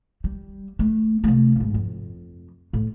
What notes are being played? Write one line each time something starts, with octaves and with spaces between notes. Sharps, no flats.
G3
A3
C3 A3
A1 G#2
F2
A2